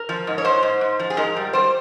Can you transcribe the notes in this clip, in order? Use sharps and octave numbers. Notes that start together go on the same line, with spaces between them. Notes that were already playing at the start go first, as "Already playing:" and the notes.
Already playing: A#4
F3
G#2
C#5
G#2 C5
G#2
G#2
F3
G#4
G#2 A#4
G3
G3 C5